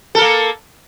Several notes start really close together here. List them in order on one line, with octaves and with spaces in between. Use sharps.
A4 A#4 A#3